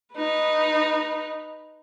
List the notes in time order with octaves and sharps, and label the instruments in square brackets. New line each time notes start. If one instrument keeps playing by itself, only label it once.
[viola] D#4 B4